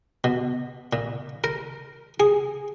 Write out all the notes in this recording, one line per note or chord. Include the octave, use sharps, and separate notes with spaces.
B2
A#2
A#4
G#4